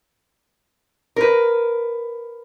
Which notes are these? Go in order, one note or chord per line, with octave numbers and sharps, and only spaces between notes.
A#4 B4